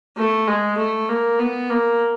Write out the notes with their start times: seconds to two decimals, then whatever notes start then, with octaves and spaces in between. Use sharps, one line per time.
0.17 A3
0.48 G#3
0.77 A3
1.09 A#3
1.39 B3
1.70 A#3